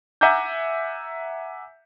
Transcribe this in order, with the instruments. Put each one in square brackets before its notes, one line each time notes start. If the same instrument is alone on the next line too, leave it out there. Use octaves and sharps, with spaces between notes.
[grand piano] E5 F#5 G#5 A#5 D6 G6